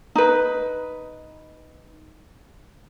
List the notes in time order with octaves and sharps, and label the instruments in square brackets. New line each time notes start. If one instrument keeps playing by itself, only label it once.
[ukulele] D#4 B4